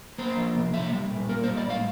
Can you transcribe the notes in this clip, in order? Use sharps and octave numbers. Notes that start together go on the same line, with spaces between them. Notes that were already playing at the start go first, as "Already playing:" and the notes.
A#3 C5
F3
C3
A#3 E5
G3
A#2
A#3 A#4
C5
G3
D5
A2 F5